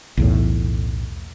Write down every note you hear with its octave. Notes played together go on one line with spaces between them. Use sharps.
B1 E2 A2